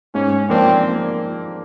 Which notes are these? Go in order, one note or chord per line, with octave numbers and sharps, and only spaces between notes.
G#2 C#4
F3 A#3 C4 D4